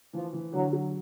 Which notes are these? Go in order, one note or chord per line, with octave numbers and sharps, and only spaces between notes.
E3 F3
E3
D3 F#3
F#3